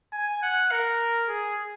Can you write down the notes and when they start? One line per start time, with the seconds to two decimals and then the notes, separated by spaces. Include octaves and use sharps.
0.12 G#5
0.42 F#5
0.71 A#4
1.28 G#4